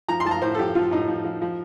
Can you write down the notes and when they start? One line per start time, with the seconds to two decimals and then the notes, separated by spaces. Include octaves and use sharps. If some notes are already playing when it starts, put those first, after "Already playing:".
0.08 F3 A#5
0.20 C6
0.25 F3 A5
0.31 A#5
0.42 A2 C5
0.54 A4
0.59 F3 G4
0.75 F3 F4
0.91 A2 D#4
1.08 F3
1.24 F3
1.42 F3